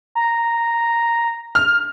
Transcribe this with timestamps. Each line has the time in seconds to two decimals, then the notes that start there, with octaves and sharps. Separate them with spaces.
0.15 A#5
1.55 F6